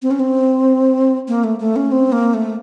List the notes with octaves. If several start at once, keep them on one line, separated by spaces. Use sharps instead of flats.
C4
C#4
C4
A#3
A3
A3
C#4
C4
A#3
A3